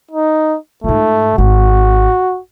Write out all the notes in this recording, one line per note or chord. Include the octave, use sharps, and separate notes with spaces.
D#4
G#2 A3 F4
G#1 F#4